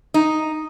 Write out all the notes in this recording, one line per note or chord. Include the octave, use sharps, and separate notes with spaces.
D#4